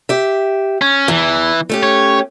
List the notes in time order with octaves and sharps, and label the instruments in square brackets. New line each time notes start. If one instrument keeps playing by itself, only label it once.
[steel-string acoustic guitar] G4 E5
[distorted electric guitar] C#4
[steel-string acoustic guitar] E2 [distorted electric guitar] E3
[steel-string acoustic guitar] A3 C#4 G4
[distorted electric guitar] C#5